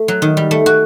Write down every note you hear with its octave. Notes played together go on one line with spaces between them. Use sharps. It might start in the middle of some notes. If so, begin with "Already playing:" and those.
Already playing: A3
F#3
D#3
G3
A3
F#4